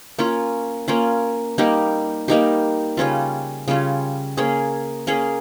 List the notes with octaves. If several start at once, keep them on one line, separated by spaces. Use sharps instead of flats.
A#3 C#4 F4
A#3 C#4 F4
G3 A#3 D#4 G4
G3 A#3 D#4 G4
C#3 G3 C#4 F4
C#3 G3 C#4 F4
A#3 C#4 G#4
A#3 C#4 G#4